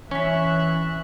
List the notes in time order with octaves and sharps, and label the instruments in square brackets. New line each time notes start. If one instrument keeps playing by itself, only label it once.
[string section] E3 E5 F#6 [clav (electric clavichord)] C#4 [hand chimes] C#6 B6